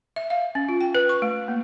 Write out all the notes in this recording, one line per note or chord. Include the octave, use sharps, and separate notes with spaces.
E5
F5
C#4
F4
G5
B4
C#6
A3
A#3